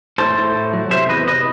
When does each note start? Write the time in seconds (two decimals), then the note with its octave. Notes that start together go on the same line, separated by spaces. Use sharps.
0.18 A2 A4 C5
0.36 A2
0.55 A2
0.73 F#3
0.91 C3 C5 E5
1.09 E2 B4 D#5
1.27 C3 B4 D#5